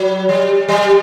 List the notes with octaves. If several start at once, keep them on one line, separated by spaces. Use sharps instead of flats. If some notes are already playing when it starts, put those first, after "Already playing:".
Already playing: F#3
G3
G3